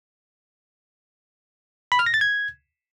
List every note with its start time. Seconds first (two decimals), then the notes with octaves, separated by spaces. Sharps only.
1.92 B5
1.99 F6
2.06 A#6
2.14 A6
2.21 G#6